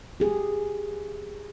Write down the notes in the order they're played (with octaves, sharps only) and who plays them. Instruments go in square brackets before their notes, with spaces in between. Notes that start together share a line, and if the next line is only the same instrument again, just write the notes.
[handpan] G4 G#4